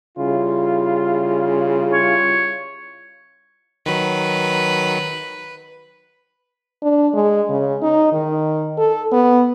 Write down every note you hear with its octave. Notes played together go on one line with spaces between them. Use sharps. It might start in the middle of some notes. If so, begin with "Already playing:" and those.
C#3 G3 E4 F4
C#5
D#3 F#3 B4
D4
G#3
C#3
D#4
D#3
A4
B3